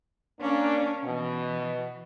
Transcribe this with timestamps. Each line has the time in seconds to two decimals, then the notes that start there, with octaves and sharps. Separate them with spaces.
0.41 A#3 C#4 D4
1.05 B2 E3